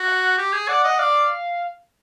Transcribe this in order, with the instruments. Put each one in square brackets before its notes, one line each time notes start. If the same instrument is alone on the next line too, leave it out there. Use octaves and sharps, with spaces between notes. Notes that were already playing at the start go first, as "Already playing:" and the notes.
Already playing: [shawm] F#4
[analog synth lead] F#5
[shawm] G4
G#4
[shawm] D5 [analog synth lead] F#5
[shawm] D#5
[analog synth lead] F#5
[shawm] D5 [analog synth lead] F5